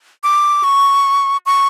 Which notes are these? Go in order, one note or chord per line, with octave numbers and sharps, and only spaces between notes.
D6
C#6
C#6